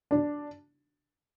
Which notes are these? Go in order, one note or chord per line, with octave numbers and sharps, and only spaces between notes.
D4